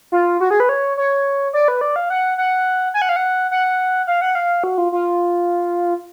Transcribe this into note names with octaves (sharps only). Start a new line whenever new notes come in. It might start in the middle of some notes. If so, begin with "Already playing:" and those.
F4
F#4
G#4
B4
C#5
C#5
D5
B4
D5
F5
F#5
F#5
G#5
F#5
F5
F#5
F#5
F5
F#5
F5
F#4
F4
F4